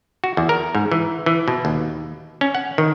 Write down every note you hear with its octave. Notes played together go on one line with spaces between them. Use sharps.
F#4
E2
A#4
G#2
E3
E3
B2
D#2
C#4
F#5
D#3